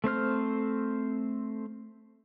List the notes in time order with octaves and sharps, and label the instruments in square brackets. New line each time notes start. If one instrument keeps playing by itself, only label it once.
[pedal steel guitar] A3 C4 C5 F6